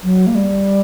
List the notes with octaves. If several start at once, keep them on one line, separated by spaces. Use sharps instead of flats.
F#3
A#3
G3